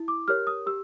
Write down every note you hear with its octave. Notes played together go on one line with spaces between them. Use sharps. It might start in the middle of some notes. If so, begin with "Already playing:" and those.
Already playing: E4
D6
G4 A#4 C#5 F6
D#6
G4 E6